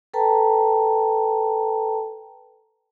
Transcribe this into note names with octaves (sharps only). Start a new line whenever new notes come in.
A4 B4 G5 A5 A#5